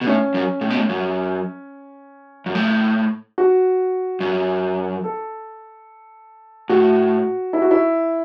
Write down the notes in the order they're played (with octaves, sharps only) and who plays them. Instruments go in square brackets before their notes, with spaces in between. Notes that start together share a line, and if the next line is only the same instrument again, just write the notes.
[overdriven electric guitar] B2
[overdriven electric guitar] A2 [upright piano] C#4
[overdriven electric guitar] F#2
A2
B2
A2
F#2
F#2
A2
[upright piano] F#4
[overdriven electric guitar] F#2
[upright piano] A4
[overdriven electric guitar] A2 [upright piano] F#4
[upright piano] E4
F#4
E4